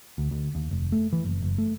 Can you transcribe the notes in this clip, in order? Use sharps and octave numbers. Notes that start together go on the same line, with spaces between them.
D2
D2
D#2
F1
A3
E3
F#1
F#1
A3